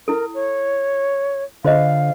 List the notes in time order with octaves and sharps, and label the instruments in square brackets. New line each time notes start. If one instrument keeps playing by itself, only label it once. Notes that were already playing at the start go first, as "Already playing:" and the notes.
[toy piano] E4 A4 [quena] A#4
[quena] C#5
[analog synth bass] D3 [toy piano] F4 C5 D#5 [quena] F5